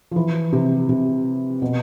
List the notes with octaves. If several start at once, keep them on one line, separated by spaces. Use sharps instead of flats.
F3
E3
C3
C3
B2